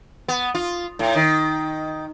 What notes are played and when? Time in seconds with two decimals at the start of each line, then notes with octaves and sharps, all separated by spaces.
0.28 B3
0.55 F4
0.99 A2
1.15 D#3